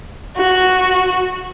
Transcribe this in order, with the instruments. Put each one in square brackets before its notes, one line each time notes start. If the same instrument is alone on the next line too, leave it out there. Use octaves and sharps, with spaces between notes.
[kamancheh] F#4